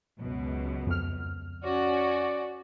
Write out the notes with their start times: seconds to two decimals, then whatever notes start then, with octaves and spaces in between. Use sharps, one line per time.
0.19 C#2 F#2 B2
0.87 F2 F6
1.64 C#4 F#4 D5